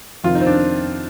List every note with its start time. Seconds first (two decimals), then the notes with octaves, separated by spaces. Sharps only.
0.24 F2 C3 D#3 F4
0.35 D#4
0.41 C4
0.46 D4